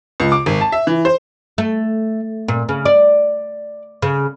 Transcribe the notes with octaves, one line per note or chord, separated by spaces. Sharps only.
C#2
D6
G#1
A5
E5
E3
C5
A3
A#2
C#3
D5
C#3